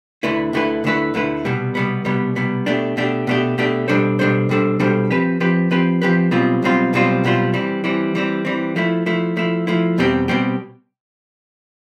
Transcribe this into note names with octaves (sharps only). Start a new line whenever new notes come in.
D2 D3 A3 E4 B4
D2 D3 A3 E4 B4
D2 D3 A3 E4 B4
D2 D3 A3 E4 B4
C2 B2 G3 B3
C2 B2 G3 B3
C2 B2 G3 B3
C2 B2 G3 B3
B2 A3 D4 G4
B2 A3 D4 G4
B2 A3 D4 G4
B2 A3 D4 G4
B2 G3 D4 A4 C5
B2 G3 D4 A4 C5
B2 G3 D4 A4 C5
B2 G3 D4 A4 C5
F3 C4 G4 B4
F3 C4 G4 B4
F3 C4 G4 B4
F3 C4 G4 B4
B1 B2 G3 C4 F4
B1 B2 G3 C4 F4
B1 B2 G3 C4 F4
B1 B2 G3 C4 F4
E3 G3 C4
E3 G3 C4
E3 G3 C4
E3 G3 C4
F3 A3 E4
F3 A3 E4
F3 A3 E4
F3 A3 E4
E2 B2 G3 C4 G4
B2 G3 C4 G4